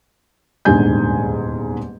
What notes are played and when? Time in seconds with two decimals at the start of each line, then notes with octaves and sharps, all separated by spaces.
0.65 D#1 E2 G#2 D3 G#5 G6